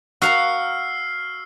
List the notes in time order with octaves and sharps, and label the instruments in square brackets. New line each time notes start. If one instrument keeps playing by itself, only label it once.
[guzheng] F#4 F5 A#5 [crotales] E6 F6 C7